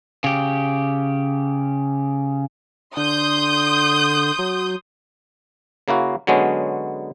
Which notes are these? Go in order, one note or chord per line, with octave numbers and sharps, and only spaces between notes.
C#3 G4
D3 C6 D#6 G6
F#3
C#3 A#3 E4 F#4
D3 F#3 G#3 B3 C#4